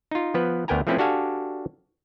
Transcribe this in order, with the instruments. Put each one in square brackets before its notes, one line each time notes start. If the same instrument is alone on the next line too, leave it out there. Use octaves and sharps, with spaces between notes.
[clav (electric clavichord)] D#4 F4
F3 B3 B4
D2 B3 A#4 G5 G#5 A#5
F3 A3 C4 C#4 E4 B4
D4 F#4 G4 A4 F5 G#5